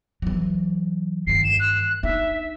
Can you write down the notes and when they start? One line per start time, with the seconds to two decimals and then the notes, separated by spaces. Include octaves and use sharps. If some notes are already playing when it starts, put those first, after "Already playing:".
0.22 E3 F#3
1.27 G2 D#3 C7
1.44 E7
1.60 F#6
2.03 D4 D#4 E5